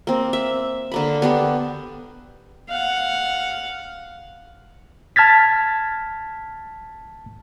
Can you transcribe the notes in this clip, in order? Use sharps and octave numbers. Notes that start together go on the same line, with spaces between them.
A#3 C4
E5
D3 A#3 B5
B3 D4 G4
F5 F#5
A5 F6 G#6 A6 B6